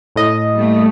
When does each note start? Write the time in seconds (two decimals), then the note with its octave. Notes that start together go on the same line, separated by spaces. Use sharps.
0.16 A2 D#5
0.53 G3 A3